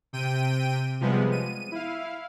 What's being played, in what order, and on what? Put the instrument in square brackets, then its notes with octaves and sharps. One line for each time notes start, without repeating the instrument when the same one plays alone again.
[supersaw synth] C3 G5 D#7
C3 F3 G3 G#3 B3
D#7
E4 F5